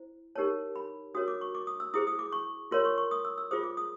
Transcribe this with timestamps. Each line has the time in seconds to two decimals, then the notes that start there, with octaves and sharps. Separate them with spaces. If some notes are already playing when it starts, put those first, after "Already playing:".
Already playing: E4 C5
0.35 D#4 G4 A#4 C#5 A5
0.76 B5
1.14 D4 F#4 A#4 C#5 D#6
1.28 D6
1.41 C#6
1.55 D6
1.67 D#6
1.80 E6
1.94 E4 G#4 C5 D#6
2.07 D#6
2.19 D6
2.32 C#6
2.71 F4 A#4 C#5 C6
2.85 C#6
2.98 C#6
3.11 D#6
3.25 E6
3.38 E6
3.51 F4 G#4 C5 D#6
3.63 D6
3.77 D#6